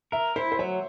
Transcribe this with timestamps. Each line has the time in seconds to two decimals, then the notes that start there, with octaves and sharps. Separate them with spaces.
0.12 A#4 E5
0.36 E4 C5
0.52 C5
0.59 F#3 C#5